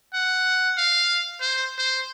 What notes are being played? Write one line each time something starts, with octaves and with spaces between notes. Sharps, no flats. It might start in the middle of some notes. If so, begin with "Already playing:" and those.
F#5
F5
C5
C5